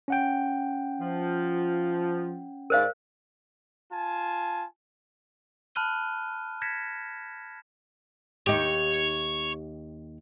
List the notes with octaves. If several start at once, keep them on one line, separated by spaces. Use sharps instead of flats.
C#4 F#5 G5
F3
G#2 G#3 A#4 C5 D5 F5
F4 G#5 A5
A5 B5 F6 F#6 D#7 G7
G6 G#6 A#6 B6 C#7 E7
D#2 D#4 G4 C#5